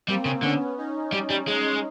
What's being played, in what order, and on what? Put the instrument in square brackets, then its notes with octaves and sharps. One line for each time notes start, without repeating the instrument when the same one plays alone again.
[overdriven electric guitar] G3 [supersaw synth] A#3 C4
[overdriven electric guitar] C#3
[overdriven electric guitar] D3 [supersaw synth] B3 C#4
[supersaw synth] C#4 D#4
[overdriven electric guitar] G3
G3
G#3